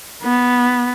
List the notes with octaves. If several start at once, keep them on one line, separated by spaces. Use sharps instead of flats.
B3